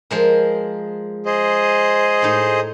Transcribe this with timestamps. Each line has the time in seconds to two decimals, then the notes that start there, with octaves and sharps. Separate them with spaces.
0.11 F3 G#3 A#4
1.26 G#4 C5 D#5
2.22 A2 D#4